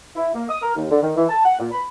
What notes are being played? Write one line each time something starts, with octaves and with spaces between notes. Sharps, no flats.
E4
A#3
D#6
A#4
D#2
D3
D#3
E3
A5
F#5
A#2
B5